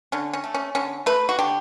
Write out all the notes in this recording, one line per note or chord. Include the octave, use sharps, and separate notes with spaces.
D3 C#4
C#4
A3
C#4
D3 C#4
A3 B4
F#4
D3 G4